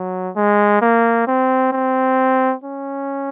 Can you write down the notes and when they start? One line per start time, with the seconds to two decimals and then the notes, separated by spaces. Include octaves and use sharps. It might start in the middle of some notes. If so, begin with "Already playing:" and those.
Already playing: F#3
0.36 G#3
0.82 A#3
1.27 C4
1.73 C4
2.64 C#4